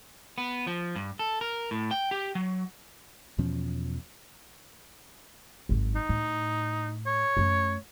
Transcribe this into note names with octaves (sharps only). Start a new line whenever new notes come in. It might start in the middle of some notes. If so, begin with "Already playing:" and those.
B3
F3
G2
A4
A#4
A2
G5
G4
F#3
E2 B2 F3 C#4
G#1 F#2
D#4
A2
C#5
F#2 A3